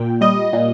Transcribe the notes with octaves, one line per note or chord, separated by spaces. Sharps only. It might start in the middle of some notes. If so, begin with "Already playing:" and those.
Already playing: A#2 G5
G3 D#5
A#2